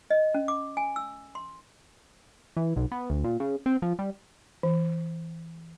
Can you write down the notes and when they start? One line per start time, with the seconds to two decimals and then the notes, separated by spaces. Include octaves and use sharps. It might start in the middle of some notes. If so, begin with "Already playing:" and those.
0.10 D#5
0.34 C#4
0.48 D6
0.77 G#5
0.96 E6
1.35 C6
2.57 E3
2.76 B1
2.92 B3
3.10 D2
3.24 A#2
3.40 C#3
3.66 C4
3.82 F3
3.99 G3
4.63 E3